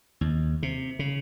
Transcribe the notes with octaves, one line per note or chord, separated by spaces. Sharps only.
D#2
C3
C#3